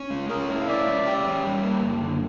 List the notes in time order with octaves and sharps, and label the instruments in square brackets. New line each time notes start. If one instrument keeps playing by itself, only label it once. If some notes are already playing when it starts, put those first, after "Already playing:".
Already playing: [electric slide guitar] C#4
G#3
[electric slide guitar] C#4 [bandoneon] G#4 A#4
[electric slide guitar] E4
[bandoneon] F5
[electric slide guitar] C#4 [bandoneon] D5 E5
[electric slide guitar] G#3
G4
C#4
G3
A#3
F#2
D3